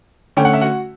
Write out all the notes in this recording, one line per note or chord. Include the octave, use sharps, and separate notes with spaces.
D3 A3 C#4 G5
F#5
E5
F#4 F#5